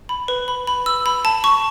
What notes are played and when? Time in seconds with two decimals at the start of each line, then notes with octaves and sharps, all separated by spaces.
0.09 B5
0.28 B4
0.48 B5
0.67 B5
0.86 E6
1.06 B5
1.25 A5
1.44 C#6